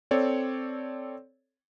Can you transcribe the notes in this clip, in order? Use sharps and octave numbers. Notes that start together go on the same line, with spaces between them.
C4 A4 C#5 D5